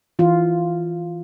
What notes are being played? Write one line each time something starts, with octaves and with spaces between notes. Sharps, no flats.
E3 F4